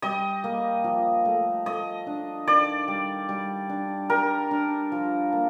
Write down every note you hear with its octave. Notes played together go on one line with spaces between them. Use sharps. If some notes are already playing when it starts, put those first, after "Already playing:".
G3 D#5
A#3
F3
A3
A3 D#5
D4
D#3 D5
G3
G3
D4
G3 A#4
D4
F3
A#3